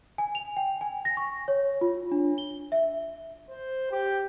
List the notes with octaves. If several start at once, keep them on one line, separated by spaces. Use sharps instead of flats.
G#5
F7
G5
G#5
A#6
C#6
C#5
F4
D4
G7
E5
C5
G4